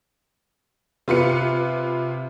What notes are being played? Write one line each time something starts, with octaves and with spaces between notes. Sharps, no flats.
C3 F4 B4 C#7